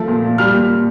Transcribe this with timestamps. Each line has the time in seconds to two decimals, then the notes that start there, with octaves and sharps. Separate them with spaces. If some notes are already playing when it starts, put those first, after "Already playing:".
Already playing: F3 A3
0.08 A#2
0.24 A#2
0.38 G3 F6
0.54 A#2
0.69 A#2